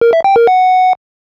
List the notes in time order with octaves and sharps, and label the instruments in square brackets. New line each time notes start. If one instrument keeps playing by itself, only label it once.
[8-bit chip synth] A#4
E5
G5
A#4
F#5